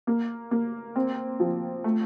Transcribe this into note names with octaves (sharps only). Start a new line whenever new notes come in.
A#3
A#3
C4
F3
A3